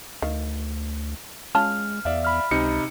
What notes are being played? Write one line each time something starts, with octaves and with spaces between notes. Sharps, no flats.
D2 D#3 F5
G#3 C#4 F4 A5 F6
E2 D5 E5 F5
B5 F6
C#2 C3 D#4 C#7